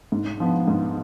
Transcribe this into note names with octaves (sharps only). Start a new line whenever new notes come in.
G#2
F3 B3
G#2